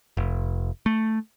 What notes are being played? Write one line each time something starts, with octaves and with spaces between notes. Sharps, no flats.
F1
A3